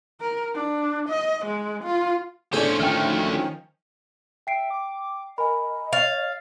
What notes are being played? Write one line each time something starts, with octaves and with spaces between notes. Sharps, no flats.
A#4
D4
D#5
G#3
F4
A2 C#4 D4 G#4 A4 C5 G#5
D2 D#3 F3 A3 C#4 G5 F6
E5 G5 C7 D7
D6
A#4 D#5 G#5 B5
C#5 F5 A6